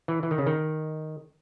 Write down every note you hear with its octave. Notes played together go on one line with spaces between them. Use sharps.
E3
E3
D#3
C#3
D#3